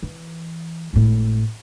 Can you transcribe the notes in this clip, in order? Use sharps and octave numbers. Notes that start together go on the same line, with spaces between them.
E3
G#1 A2